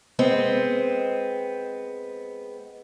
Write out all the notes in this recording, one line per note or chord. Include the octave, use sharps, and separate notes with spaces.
G#3 B3 C4